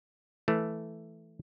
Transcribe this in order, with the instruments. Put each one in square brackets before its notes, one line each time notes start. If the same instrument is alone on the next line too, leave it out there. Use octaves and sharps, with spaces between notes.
[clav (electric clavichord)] E3 A3